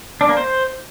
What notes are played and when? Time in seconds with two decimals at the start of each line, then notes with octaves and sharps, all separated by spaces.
0.21 D4
0.29 A#3
0.37 C5